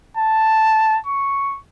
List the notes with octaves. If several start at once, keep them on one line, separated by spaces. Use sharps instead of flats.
A5
C#6